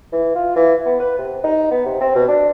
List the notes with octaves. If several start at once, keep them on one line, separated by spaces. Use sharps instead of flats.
E3
F4
E3
B3
B4
C3
D#4
B3
C3
C4
B2
D4